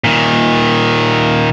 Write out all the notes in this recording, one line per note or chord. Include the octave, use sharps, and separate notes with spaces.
A#2 D#3